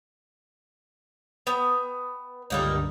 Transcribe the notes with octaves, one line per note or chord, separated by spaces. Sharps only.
B3 G5
C#2 G2 D3 G3 A#3 D#4